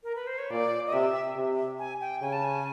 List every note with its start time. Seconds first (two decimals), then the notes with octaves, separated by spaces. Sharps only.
0.03 A#4
0.15 B4
0.27 C5
0.38 C#5
0.50 A#2 D5
0.87 D#5
0.93 C3 E5
1.36 C3
1.79 G#5
2.01 G5
2.22 C#3 G#5
2.32 A5
2.44 G#5